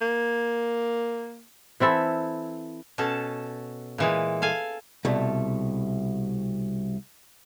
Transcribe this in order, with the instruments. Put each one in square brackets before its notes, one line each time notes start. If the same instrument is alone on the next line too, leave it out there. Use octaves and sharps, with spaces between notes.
[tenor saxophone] A#3
[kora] E3 C4 E4 A4
[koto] B2 C#4 A4 A5
A#2 E3 G#3
A4 F5 G#5
[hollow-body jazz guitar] C2 B2 A3